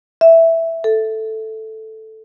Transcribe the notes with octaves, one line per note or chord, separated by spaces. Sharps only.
E5
A4